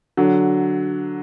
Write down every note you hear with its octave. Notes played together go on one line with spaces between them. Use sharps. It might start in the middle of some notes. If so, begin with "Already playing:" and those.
D3 F#3